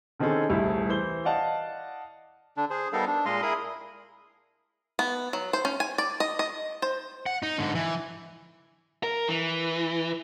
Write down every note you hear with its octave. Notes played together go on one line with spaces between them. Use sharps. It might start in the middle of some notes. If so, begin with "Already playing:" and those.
D3 D#3 C4 C#4 G#4 A4
D#1 C2 A3 E4 G#4
E3 C5 G7
D5 D#5 F5 F#5 A5
D3 D4
G#4 C5
G3 B3 D#4 A4 A#4 F5
D4
A#2 G#3 D#5 F5 C6
E4 G#4 A#4 B5 D#6
B3
F#3
C5
C#4
G#5
D5
D#5
D#5
C5
F#5
D#4
G#2 D3
E3
A#4
E3